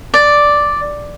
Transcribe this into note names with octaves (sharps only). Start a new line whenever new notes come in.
D5